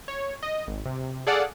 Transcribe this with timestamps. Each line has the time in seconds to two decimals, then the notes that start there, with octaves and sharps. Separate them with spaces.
0.08 C#5
0.43 D#5
0.68 G#1
0.86 C3
1.27 G#4 A4 D5 F5 F#5